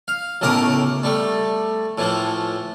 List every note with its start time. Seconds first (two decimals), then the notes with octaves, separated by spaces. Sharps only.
0.08 F5
0.41 B1 A2 C#3 A#4 D6 D#6
1.04 G3 A3
1.98 A2 E3 F3